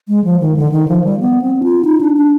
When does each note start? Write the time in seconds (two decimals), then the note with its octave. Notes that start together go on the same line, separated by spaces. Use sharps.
0.08 G#3
0.24 F3
0.40 D#3
0.57 D3
0.72 D#3
0.88 F3
1.04 G3
1.20 B3
1.42 C4
1.63 F4
1.85 D#4
2.01 D4
2.17 D4